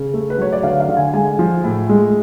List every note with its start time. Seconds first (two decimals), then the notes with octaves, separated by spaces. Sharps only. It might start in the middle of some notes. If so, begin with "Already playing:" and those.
Already playing: C#3
0.14 A3
0.30 B4
0.38 F#3 C#5
0.53 D5
0.63 D3 F5
0.80 F5
0.88 D3
0.97 G#5
1.14 G#3 G#5
1.39 F3
1.64 A2
1.89 G#3